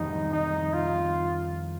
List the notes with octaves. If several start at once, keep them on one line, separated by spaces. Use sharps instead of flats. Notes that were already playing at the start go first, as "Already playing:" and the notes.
Already playing: F2 D#3 G3 C4 D#4
D#4
F4